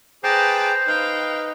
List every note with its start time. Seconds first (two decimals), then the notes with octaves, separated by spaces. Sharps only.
0.24 G#4 B4 C5 G5 A5 A#5 D6
0.87 D#4 B4 F5 G5